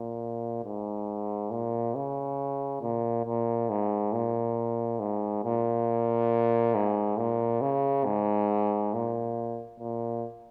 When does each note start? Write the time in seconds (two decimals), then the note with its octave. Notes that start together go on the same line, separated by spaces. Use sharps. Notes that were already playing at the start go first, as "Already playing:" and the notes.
Already playing: A#2
0.64 G#2
1.51 A#2
1.95 C#3
2.81 A#2
3.25 A#2
3.70 G#2
4.13 A#2
5.00 G#2
5.44 A#2
6.75 G#2
7.18 A#2
7.62 C#3
8.05 G#2
8.94 A#2
9.80 A#2